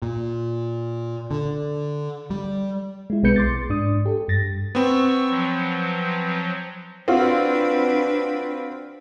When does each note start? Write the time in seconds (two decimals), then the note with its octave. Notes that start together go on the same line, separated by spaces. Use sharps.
0.02 A#2
1.31 D3
2.30 G3
3.10 G#3 E4
3.23 B1 G#3 B3 B4 G6 C#7
3.36 C6 D6 A6
3.69 G#2 D4 D#6
4.06 G4 A4
4.28 G2 A6 A#6
4.75 B3 C4 C#6 E6
5.30 F3 F#3
7.08 C4 D4 F4 F#4 B4